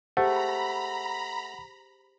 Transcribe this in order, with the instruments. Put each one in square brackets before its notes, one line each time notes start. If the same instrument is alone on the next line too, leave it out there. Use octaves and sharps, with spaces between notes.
[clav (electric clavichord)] A3 [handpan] G4 G#4 C5 [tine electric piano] F#5 [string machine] A#5 B5